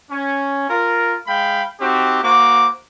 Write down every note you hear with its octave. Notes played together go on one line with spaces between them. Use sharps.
C#4
F4 A#4
G#3 F5 G5 B5
C4 D#4 F#4 G4
A#3 F#4 C5 D6